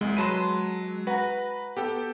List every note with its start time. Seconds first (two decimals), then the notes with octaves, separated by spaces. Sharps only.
0.01 C2 G#3
0.17 F#3 B4 A5 C6 D#7
1.07 F#4 B4 A#5
1.77 B3 G4 A4 G5